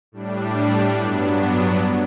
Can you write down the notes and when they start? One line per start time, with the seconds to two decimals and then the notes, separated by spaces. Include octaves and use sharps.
0.12 A2 G3 D4
0.95 G2 F#3 B3 D4